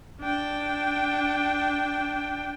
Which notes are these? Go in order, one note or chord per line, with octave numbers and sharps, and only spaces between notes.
D4 G5